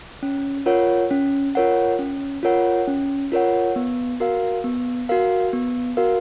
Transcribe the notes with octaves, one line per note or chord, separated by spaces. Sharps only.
C#4
F4 A#4 C#5 F#5
C#4
F4 A#4 C#5 F#5
C#4
F4 A#4 C#5 F#5
C#4
F4 A#4 C#5 F#5
B3
F#4 A#4 F5
B3
F#4 A#4 F5
B3
F#4 A#4 F5